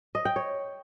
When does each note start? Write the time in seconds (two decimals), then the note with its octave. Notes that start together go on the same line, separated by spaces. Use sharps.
0.15 D#5
0.25 G5
0.36 C#5